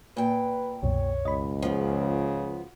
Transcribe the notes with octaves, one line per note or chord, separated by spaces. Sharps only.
A#2 B4 G5
C2 F#2 B2 C#5
C#2 D#5 B5
C#3 F3 B3